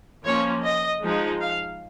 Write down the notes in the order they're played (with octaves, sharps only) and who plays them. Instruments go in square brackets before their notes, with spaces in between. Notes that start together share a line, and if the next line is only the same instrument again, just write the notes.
[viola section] F3 A#3 C#4 C#5
D#5
F3 G#3 D#4
F5